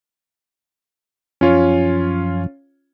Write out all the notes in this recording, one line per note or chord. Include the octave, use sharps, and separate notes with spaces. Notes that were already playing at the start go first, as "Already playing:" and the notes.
F#2 F3 C#4 F4 C#5